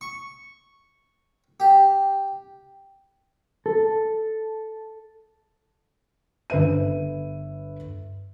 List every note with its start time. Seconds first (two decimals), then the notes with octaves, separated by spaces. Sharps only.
0.01 C#6
1.60 G4
3.66 A4
6.50 G1 B4 E5 D#7